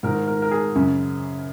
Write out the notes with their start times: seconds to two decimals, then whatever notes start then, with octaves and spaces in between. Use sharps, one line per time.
0.03 G#2 D#3 A#4
0.27 A#4
0.42 A#4
0.51 G#4
0.75 F#2 C#3